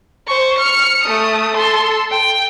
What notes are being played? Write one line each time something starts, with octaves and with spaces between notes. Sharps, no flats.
C5 C#6
F6 C#7
A3 D#6
A4 C6
G5